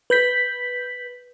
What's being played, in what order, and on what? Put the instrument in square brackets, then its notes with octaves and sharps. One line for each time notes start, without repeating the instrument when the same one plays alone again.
[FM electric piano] B4 G6 B6